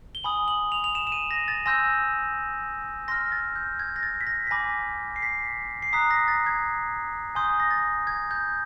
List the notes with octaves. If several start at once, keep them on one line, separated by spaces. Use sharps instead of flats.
G7
G#5 B5 D#6 F#7
F#7
F7
F7
E7
E7
D#7
A#6
A6
G#5 C6 E6 G6 A#6
C6 F6 A#6
A6
G6
G#6
A#6
A6
B6
A#6
B6
G#5 B5 D6 A#6
C7
B6
C7
A#5 D#6 F#6 B6
A#6
A6
G#6
G#5 C6 D#6 G6
A#6
A6
G#6
G6